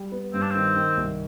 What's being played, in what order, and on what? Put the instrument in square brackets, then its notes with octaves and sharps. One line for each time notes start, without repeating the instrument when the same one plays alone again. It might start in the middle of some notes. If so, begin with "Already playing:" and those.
Already playing: [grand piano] G3
B3
[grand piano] G2 [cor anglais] C4
[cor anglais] D4
[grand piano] D#3 [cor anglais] C4
[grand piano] D#3
C2